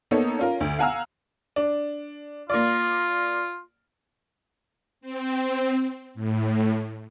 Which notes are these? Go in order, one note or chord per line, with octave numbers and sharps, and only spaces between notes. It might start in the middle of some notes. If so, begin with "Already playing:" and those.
A#3 B3 D#4 A4 C#5
C#4 F4 A#4
D2
F5 F#5 G#5 A#5 E6 F6
D4
A#3 F4 D5
C4
A2